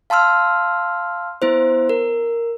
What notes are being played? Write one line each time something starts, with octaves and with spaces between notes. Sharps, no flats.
F5 A5 C6 E6 F6
B3 E4 C5
A#4